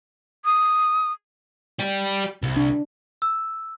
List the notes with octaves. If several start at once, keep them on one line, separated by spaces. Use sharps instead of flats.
D#6
G4 D5
C2
D4
E6